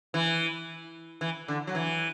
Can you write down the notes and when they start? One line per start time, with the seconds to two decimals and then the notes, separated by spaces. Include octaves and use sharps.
0.14 E3
1.21 E3
1.48 D3
1.67 F#3
1.75 E3